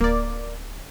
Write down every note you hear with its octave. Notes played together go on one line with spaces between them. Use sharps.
D1 A#3 D5